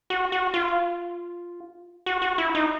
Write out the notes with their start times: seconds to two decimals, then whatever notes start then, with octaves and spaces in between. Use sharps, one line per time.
0.10 F#4
0.32 F#4
0.54 F4
2.06 F#4
2.22 F#4
2.38 E4
2.55 D#4